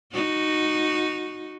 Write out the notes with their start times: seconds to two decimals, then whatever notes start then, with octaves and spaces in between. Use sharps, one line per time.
0.12 D#4 F#4